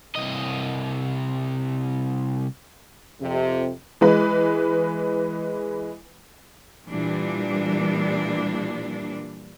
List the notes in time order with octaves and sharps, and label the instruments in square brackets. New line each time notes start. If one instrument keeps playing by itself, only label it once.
[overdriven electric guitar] C2 D#5
[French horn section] F2 C3
[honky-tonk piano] E3 G#3 B4
[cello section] A#2 E3 G3 D4